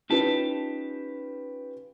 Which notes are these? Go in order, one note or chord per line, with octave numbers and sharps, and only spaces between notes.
C#4 D#4 F4 G4 B4 A5